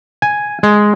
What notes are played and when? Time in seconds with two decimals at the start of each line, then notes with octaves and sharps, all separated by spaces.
0.22 G#5
0.63 G#3